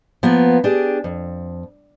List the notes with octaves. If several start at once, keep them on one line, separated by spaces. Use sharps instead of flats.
F3 A#3 B3
D4 G4 G#4
F2